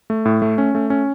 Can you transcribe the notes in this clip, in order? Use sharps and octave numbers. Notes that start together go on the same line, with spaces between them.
A3
A2
A3
C#4
A3
C#4